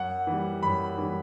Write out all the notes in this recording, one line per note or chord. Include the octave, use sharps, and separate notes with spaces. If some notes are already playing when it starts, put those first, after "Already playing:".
Already playing: F#2 F#5
E3
G3
F#2 B5
E3 G3